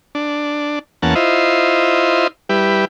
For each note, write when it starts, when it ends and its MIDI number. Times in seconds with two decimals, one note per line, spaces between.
0.15 0.79 62
1.02 1.14 40
1.02 1.14 58
1.02 1.14 61
1.02 1.14 78
1.02 1.14 81
1.15 2.27 64
1.15 2.27 65
1.15 2.27 72
1.15 2.27 75
2.49 2.85 55
2.49 2.85 64
2.49 2.85 67
2.49 2.85 71